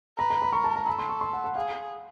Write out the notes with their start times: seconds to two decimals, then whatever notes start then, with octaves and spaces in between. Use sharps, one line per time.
0.18 B4 A#5
0.30 A#5
0.42 B5
0.52 A#4 C#6
0.64 A5
0.76 A#5
0.87 A4 B5
0.98 C6
1.09 C#6
1.21 C6
1.33 F#5
1.44 F#5
1.55 G#4 F5